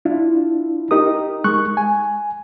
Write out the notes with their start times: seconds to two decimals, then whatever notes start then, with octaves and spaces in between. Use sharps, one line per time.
0.05 D4 E4 F4
0.91 D#4 G4 A#4 D#6
1.44 G#3 C#6 F#6
1.77 G#5